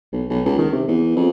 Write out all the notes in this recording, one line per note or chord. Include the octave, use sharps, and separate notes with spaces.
B1
B1
C#2
D#3
C3
E2
F2